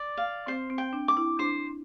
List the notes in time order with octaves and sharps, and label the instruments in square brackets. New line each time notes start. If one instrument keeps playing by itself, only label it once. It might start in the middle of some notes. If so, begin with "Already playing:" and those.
Already playing: [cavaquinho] D5
F5
[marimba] C4 [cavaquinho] C5
[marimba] C4
[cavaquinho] G5
[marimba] D4
[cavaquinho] D6
[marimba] E4
[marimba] D4 [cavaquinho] C5